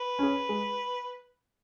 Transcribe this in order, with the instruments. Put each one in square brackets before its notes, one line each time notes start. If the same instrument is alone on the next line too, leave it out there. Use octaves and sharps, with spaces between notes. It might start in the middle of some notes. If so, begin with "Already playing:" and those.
Already playing: [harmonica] B4
[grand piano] C#4 G#4
G#3